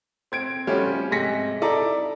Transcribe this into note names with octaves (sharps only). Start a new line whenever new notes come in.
C4 G#6 D7
F3 G3 A3 C#4 F4 F#4
G#2 C3 G#5 A#6 B6 C#7
D#4 E4 A4 D5 A#5